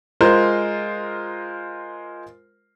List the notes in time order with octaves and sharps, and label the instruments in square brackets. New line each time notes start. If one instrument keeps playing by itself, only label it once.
[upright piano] G#3 F4 A#4 C5